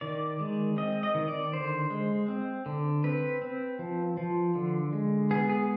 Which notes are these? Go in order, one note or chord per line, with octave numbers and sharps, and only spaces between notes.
D#3 D5
G#3
C4 D#5
D#5
D#3
D5
D3 C5
G#3
C4
D3
C4 B4
C4
F3
F3
D3
G#3
B3 G#4
G#4